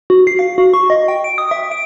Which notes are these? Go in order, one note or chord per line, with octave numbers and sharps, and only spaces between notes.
F#4
C7
F5
F#4
C#6
D#5
G5
D7
D#6
E5
D7